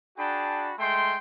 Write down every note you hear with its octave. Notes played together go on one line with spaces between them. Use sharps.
D4 F#4 G#4 G5 A5 B5
G#3 A3 G5 C6